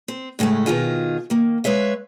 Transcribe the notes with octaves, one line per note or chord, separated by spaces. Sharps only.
C4
A2 C#3 F3 G#3 A3
B2 D#3 F4 G#4
D#3 A#3
G#3 B4 C#5 E5 F5